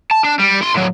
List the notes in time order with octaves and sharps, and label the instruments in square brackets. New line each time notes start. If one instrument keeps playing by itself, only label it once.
[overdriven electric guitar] A5
D4
G3
E4 C6
A2 F#3